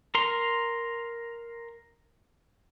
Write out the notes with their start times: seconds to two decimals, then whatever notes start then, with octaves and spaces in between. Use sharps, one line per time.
0.15 A#4 A#5 C6